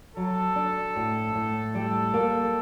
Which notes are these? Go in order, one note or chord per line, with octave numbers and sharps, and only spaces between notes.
F#3 A4
D4
A2
A2
G3
A#3